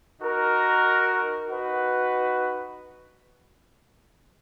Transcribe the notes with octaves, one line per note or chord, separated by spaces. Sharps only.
D#4 F#4 A#4
D#4 F#4 B4